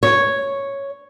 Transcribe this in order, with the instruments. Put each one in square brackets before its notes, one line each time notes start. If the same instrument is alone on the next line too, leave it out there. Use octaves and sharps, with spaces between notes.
[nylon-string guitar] C#5